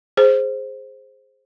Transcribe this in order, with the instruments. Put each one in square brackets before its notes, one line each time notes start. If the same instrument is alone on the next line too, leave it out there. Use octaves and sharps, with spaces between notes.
[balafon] G#4 C5